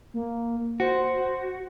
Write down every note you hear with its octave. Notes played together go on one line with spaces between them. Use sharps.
A#3
F#4 C5